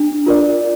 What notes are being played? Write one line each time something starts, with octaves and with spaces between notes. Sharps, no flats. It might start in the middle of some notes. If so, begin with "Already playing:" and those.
Already playing: D4
F4 A#4 D5